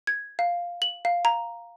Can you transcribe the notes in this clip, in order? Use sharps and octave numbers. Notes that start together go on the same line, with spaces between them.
G#6
F5
F#7
F5
A#5